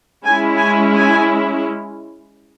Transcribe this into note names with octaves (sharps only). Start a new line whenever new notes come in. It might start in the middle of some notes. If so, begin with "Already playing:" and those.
G#3 C#4 E4 G#5
G#5
G#5